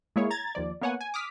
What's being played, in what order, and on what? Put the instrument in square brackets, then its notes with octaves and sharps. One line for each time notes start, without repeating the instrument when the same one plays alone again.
[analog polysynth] G#3 A#3 E4 G#4 C#5
A#5 G#6 A6
D#2 F3 D5
A#3 B3 C#5 F#5 G#5
G#5
D6 D#6 F6 B6